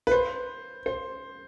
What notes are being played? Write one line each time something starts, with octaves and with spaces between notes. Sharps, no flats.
B4
C5
C5